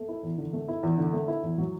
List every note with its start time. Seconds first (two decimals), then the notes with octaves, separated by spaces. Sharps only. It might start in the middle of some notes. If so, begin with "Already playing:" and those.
Already playing: A3
0.09 E4
0.23 E2
0.38 D3
0.53 A3
0.68 E4
0.83 E2
0.98 D3
1.13 A3
1.28 E4
1.43 E2
1.58 F#3